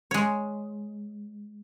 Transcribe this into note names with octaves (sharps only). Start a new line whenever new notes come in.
G#3 C#5